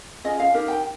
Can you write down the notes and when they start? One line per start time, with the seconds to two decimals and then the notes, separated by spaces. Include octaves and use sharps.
0.24 C#4 F4 G#4 D#5
0.40 F5
0.54 D#4 G4 A#4
0.68 G5